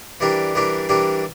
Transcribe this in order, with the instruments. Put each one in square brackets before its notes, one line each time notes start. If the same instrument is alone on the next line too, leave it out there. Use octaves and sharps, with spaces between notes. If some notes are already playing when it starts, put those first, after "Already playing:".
[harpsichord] E3 G3 D4 G4 A#4
E3 G3 D4 G4 A#4
E3 G3 D4 G4 A#4